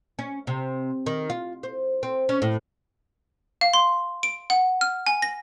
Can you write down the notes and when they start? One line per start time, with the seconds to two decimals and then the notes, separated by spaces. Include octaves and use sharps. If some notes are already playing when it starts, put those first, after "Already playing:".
0.19 C#4
0.47 C3
1.06 D#3
1.30 F4
1.63 C5
2.03 C4
2.29 C#4
2.42 A2
3.61 F5
3.74 C6
4.23 D7
4.50 F#5
4.81 F6
5.07 G#5
5.22 A#6